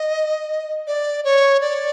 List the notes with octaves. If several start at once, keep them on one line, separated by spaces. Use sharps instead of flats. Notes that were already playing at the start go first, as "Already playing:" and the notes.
Already playing: D#5
D5
C#5
D5